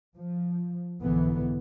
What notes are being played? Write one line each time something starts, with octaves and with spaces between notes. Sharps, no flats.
F3
B1 G#2 D3 E3 B3